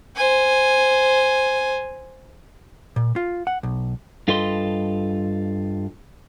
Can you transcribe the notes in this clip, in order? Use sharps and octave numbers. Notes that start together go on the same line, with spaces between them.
C5 G#5
A#2
F4
F#5
B1
G2 F4 A4 B4 D#5 C6